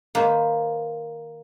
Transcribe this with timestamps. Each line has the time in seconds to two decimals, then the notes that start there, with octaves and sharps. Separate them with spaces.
0.15 D#3 A#3 B4 C5